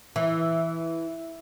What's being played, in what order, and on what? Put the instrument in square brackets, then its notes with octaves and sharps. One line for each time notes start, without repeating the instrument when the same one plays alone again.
[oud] E3